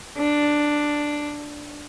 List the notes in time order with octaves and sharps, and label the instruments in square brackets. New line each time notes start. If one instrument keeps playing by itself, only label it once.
[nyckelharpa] D4